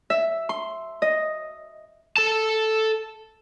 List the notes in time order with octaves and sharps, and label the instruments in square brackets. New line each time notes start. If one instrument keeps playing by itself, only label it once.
[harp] E5
C6
D#5
[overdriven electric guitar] A4 A5